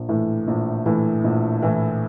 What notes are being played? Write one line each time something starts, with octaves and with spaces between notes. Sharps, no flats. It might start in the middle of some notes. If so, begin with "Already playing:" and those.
Already playing: A#1
A2 E3
A#1
A2 E3
A#1
A2 E3